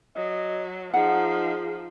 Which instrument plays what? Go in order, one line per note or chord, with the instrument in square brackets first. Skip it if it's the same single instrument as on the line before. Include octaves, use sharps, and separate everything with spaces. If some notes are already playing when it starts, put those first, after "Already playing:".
[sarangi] F#3 [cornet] D#5
[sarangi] F3 [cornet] D#4 [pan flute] G#4 [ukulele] F#5